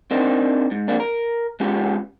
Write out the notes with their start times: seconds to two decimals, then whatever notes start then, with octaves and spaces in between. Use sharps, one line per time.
0.11 C4 D4 D#4 A#4 C5
0.71 G#2
0.88 F2 A#3 D4
1.00 A#4
1.60 G#3 B3 C#4 F4 G4